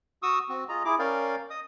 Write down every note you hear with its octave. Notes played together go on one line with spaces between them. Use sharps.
F#4 C#6 D#6 E6
C4 F#4
F4 G#4 D#5 A#5
E4 G#4 D6
C#4 A#4 D5 F5 G5
D#5 D#6